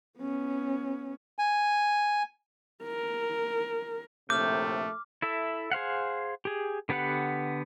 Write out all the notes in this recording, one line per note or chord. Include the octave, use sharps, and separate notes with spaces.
B3 C#4
G#5
A#4
A#1 A2 C3 A3 D6 F6 G6
E4 A4 E5
G#4 C5 F5 F#5
G4 G#4
D3 B3 G4 B4 F#5